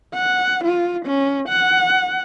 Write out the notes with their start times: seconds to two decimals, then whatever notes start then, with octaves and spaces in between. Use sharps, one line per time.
0.14 F#5
0.64 F4
1.05 C#4
1.49 F#5